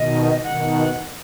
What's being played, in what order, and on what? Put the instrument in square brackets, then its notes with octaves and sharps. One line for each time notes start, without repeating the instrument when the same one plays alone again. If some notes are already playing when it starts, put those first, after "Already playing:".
Already playing: [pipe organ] B2 D#3 [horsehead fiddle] D#5
[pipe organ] B2 D#3 [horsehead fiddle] F#5